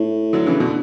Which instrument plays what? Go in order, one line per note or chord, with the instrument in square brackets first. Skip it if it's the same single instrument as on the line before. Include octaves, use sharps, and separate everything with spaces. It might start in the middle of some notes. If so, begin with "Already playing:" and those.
Already playing: [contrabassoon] A2
[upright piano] D3 F#3
C#3 E3
B2 D3